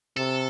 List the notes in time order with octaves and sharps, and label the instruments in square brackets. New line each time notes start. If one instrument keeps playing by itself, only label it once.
[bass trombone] C3 [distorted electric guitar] A4